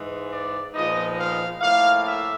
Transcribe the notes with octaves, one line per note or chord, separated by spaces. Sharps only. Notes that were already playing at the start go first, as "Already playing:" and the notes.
Already playing: G#2 E3 G#3
D5
A#2 F3 G#3 B3 D#4 D#5
F5
A2 F3 A#3 F5
E5